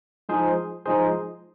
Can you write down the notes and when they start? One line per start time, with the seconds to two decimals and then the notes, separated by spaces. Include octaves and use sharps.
0.29 F3 G#3 D#4 G#4 C5
0.85 F3 G#3 D#4 G#4 C5